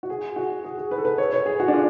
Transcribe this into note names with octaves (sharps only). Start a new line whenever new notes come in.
F#4
G#4
F#4
G#4
G#4
B4
A4
B4
C#5
C#5
G#4
F#4
D4
F4